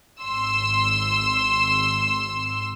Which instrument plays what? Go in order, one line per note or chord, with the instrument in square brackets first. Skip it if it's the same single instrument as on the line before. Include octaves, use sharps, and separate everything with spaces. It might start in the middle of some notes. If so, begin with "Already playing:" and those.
[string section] G#1 C6 E6